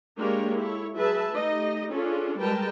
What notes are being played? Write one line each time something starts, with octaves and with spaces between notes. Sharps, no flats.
G#3 A#3 D4 G4 A#4 C#5
E4 A4 C#5
F#3 G#4 B4 E5 A5
A3 D#4 G4 D#5
C#4 D4 F4 G#4 A4
G3 G#3 A#4 B4 G5 A5